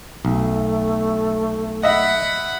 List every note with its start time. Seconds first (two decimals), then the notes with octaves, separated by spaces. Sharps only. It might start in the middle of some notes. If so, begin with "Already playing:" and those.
0.25 B1 A3
1.83 D#5 E5 F#5 B5